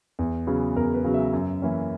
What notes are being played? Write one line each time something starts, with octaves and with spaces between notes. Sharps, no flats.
E2
C#3 F#3 B3
E2 A#4
B4
C#3 F#3 B3
E5
F#2
E3 A#3 C#4